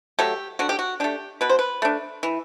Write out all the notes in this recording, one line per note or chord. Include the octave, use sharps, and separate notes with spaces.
F#3 A3 G4
D3 F#4
G4
F#4
A3 D4 G4
B2 B4
C5
B4
A3 D4
E3